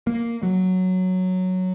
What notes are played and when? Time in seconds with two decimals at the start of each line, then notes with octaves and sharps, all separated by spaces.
0.07 A#3
0.43 F#3